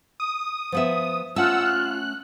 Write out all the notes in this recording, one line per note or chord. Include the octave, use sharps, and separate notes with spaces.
D#6
F3 B3 E5
A3 C#4 F4 F#5 A5 E6
F#6